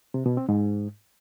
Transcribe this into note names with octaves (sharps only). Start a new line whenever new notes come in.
C3
B2
C4
G#2